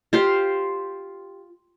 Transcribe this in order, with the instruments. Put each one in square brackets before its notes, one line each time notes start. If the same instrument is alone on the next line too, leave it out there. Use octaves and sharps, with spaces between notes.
[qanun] F4 G4 C5 F5